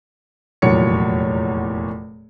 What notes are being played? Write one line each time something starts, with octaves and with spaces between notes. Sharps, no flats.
F1 E2 A#2 F#3 C#5 C#7